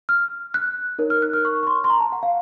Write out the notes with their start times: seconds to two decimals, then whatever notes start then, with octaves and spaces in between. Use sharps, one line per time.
0.09 F6
0.54 F#6
0.99 D#4 A#4 C#5
1.10 F6
1.22 F#6
1.33 F6
1.45 C#6
1.63 C#6
1.67 C6
1.84 C6
1.90 A#5
2.00 A5
2.12 F#5
2.23 F5